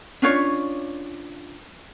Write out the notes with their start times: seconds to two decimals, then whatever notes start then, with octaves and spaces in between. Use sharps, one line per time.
0.22 C#4 D4 F4 C#5